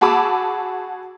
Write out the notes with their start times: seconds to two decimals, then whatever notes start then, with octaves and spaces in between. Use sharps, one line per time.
0.01 F#4 G#4 A5 B5 D6 E6